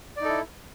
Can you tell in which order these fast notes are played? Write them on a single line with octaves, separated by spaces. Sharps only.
D5 D#4 A4 E4